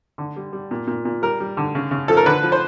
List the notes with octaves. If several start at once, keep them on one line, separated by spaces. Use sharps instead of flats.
D3
G3
G3
A#2
A#2
A#2
G3 A#4
G3
D3
C#3
C#3
F3 A4
A#4
D3 B4
F3
C5